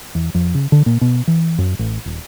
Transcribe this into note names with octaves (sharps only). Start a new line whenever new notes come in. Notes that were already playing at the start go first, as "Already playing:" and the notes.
E2
F2
C#3
D3
A#2
B2
E3
F#2
A1
D#1